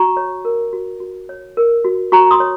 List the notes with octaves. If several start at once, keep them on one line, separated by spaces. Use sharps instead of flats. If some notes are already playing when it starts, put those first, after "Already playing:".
Already playing: F#4 A#5 C#6
C#5
A#4
F#4
F#4
C#5
A#4
F#4
F#4 A#5 C#6
C6 D#6
C#5